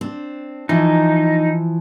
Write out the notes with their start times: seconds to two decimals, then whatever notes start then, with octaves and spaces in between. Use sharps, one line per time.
0.01 C4 D4
0.69 E3 F3 D#4